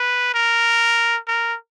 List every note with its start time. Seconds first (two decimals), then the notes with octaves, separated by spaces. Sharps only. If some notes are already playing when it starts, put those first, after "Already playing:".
Already playing: B4
0.34 A#4
1.28 A#4